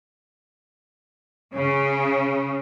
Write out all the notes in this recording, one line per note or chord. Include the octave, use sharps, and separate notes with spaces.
C#3